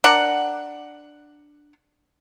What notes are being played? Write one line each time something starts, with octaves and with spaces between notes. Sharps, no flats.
D4 A#4 F#5